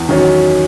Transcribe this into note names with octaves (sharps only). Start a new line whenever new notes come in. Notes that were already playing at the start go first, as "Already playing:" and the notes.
Already playing: E2
D#3 F#3 C#4